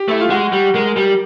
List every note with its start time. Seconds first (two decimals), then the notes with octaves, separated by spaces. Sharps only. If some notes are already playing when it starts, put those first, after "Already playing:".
Already playing: G4
0.08 A3 E4
0.21 F4
0.30 G#3 F#4
0.52 G3
0.74 G#3 A#4
0.96 G3